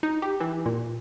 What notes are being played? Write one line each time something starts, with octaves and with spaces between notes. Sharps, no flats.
D#4
G4
E3
A#2